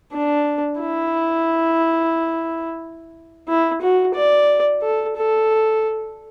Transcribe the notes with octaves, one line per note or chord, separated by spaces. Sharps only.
D4
E4
E4
F#4
D5
A4
A4